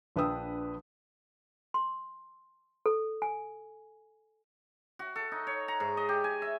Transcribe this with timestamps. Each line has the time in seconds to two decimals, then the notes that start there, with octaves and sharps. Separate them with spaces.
0.16 A#1 D4 B4 G5 D#6 E6
1.74 C6
2.86 A4
3.22 G#5
4.99 F#4
5.16 A4
5.32 D#4
5.47 C#5
5.68 A#5
5.80 G#2
5.97 D#5
6.09 G4
6.24 G#5
6.42 E5